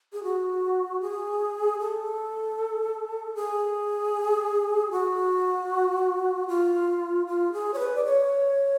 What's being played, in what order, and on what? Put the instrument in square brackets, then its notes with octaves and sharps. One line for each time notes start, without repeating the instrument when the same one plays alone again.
[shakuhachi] G#4
F#4
G#4
A4
G#4
F#4
F4
F4
G#4
C#5
B4
D5
C#5